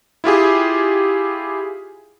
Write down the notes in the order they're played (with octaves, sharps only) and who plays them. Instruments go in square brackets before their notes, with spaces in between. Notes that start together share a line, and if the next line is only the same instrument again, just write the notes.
[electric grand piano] E4 F4 G4 G#4